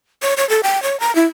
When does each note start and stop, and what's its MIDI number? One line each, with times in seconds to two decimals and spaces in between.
0.22 0.34 73
0.37 0.48 73
0.49 0.61 69
0.63 0.82 79
0.83 0.99 73
1.00 1.13 82
1.15 1.26 64